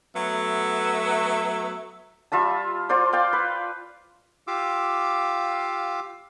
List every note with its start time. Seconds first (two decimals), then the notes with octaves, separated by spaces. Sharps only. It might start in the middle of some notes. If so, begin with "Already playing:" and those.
0.15 F#3 A3 B3 E5
2.32 G3 F4 E5 A5
2.89 F4 C5 D5
3.13 D5 F5 G5
3.33 B4
4.47 F4 G4 F5 D6 E6